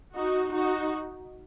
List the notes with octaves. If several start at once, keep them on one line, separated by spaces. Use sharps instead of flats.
D#4 F#4
D#4 F#4